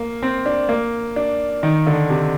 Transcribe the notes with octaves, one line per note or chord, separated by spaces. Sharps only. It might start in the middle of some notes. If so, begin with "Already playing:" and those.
Already playing: A#3
C4
D4
A#3
D4
D#3
D3
C3